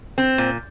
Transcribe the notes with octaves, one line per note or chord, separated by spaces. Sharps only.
C4
A#2